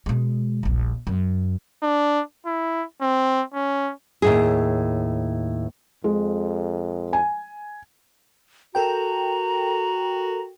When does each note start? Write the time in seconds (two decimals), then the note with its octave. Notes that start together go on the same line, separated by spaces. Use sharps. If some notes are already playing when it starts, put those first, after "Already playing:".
0.06 B2 G#3
0.63 D#1 A#1
1.07 F#2
1.82 D4
2.46 E4
3.02 C4
3.54 C#4
4.22 D#2 A2 G#4
6.04 F2 G#3
7.13 G#5
8.75 F#4 A4 A#4 G5 A#5